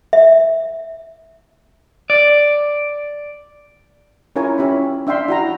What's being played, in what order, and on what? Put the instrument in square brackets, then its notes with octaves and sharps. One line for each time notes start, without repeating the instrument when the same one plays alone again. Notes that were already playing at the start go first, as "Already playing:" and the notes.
[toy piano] E5
[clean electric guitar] D5
[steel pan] C#4 E4 F4 A#4 C#5 G#5
C#4 E4 G4 E5 B5
D4 E5 F5 G5 C6
E4 F#4 A#5